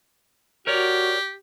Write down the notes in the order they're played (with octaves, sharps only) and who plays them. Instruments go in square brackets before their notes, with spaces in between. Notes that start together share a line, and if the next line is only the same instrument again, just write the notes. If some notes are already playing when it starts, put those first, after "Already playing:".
[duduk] F#4 [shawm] G4 [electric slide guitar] A#4 C#5 D5